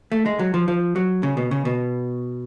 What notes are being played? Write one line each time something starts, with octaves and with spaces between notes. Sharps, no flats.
A3
G#3
F#3
F3
F3
F#3
C#3
B2
C#3
B2